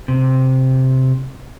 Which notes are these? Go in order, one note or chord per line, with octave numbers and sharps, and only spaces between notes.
C3